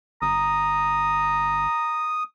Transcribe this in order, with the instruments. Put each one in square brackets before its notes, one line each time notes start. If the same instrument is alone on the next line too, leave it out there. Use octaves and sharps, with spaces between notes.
[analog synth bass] G1 [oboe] A#5 [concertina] D#6